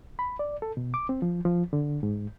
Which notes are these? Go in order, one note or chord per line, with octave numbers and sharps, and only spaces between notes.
B5
D5
A4
B2
D6
C4
F3
F3
D3
G#2